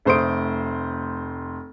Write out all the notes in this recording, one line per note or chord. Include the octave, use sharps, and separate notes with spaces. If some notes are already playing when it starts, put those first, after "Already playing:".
F1 A3 C5 C6 D#6 D7